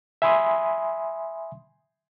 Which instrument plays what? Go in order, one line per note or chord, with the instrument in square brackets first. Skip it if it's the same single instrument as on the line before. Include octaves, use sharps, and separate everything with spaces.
[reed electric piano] E5 G#5 B5 C6 D#6